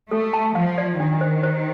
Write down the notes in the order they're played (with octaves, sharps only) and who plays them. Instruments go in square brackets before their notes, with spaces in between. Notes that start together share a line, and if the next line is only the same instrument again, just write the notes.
[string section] A3 [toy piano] A4
[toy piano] A5
[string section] F3 [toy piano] F5
[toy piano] D5
[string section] D#3 [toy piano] D4
[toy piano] C5
C5